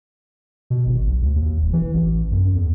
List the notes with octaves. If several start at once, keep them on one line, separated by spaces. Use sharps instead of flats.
B2
G#1
B1
D2
D#2
E1
E3
A1
F#2
E2